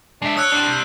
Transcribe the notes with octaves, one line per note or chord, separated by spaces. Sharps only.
G#3 D4 E5
C#5 D#6 E6 F#6
G3 C4 D4